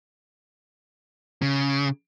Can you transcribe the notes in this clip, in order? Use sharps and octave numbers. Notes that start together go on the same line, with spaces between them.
C#3